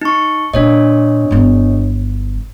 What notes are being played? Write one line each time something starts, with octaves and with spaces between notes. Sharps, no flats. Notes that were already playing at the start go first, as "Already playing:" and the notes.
D#4 C#6
A#2 D4 C#5 D#5
G1 E4